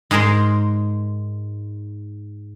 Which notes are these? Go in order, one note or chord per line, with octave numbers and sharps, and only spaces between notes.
G#2 G#3 G#4 A#4 C5